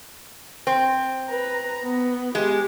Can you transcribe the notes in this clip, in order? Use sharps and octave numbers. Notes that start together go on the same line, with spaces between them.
C4
B4 A#5
B3
G#3 G4